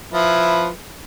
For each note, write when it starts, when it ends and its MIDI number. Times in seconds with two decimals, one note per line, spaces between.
0.13 0.68 53
0.13 0.68 64
0.13 0.68 71